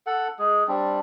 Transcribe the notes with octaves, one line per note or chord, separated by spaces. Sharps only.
A4 F#5
G#3 G#4
G3 C4 D4